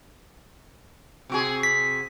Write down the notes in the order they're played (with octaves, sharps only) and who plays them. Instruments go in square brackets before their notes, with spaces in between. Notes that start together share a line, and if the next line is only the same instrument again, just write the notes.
[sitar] C3 F#4 G#4
[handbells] B6